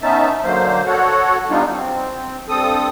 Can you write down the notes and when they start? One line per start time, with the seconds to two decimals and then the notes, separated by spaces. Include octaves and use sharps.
0.02 B3 C#4 D#4 E5 A5
0.44 D3 F#3 A#3 C5
0.87 F#4 A4 C#5 F#5
1.50 G3 B3 D4 D#4 F4
1.70 C4
2.49 G2 C4 A4 D#6